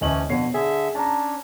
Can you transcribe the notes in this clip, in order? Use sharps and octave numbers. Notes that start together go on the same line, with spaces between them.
D2 E3 A3 C#4 D#5 F#7
F2 B2 D3 C#5 C7
D3 G#4 E5
C#4 D4 A5 A#5